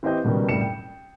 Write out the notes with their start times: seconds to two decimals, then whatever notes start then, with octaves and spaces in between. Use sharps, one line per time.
0.03 E3 C4 E4 G4 D#5 G6
0.24 C#2 B2 D#3 G3
0.49 F#1 C2 A2 G3 C#7 E7
0.62 G5